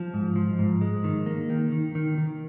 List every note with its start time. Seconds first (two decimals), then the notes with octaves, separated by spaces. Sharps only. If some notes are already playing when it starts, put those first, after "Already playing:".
Already playing: F3
0.14 G#2
0.36 F3
0.59 G#2
0.81 G#3
1.04 D#3
1.26 A#3
1.50 D#3
1.72 D#3
1.95 D#3
2.18 D#3